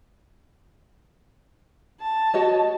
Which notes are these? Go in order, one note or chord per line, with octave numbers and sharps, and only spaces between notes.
A5
F#4 C#5 D#5